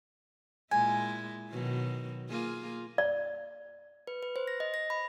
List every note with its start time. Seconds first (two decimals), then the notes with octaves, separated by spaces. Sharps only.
0.71 A#2 G#3 E4 G#5
1.50 B2 D#3 F#3
2.29 A#3 F4 G#4
2.98 D5
4.07 B4
4.23 B4
4.36 C5
4.48 A#6
4.60 D#5
4.74 A#6
4.90 B5